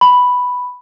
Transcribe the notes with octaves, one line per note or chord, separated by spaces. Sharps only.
B5